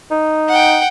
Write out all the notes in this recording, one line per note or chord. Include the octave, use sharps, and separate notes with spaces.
D#4
F#5 G5